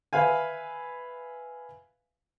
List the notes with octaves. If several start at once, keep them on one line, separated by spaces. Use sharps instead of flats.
B4 E5 F5 G#5